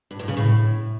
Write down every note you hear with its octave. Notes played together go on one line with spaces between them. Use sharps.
G2
A2
C#3
A2